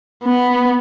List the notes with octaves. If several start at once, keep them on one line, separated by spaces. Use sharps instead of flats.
B3